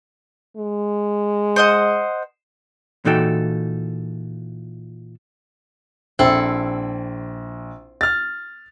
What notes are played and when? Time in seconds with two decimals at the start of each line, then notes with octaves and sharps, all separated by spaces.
0.57 G#3
1.56 C5 D#5 F#5
3.05 A#2 E3 D#4 F#4 A4 G5
6.19 A#1 C4 E4 A4
8.01 F6 A6